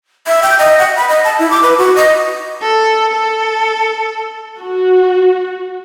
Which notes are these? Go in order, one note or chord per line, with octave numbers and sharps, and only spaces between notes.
E5
G5
D#5
F#5
B5
D#5
A5
E4
D6
B4
F#4
D#5
A4
A4
F#4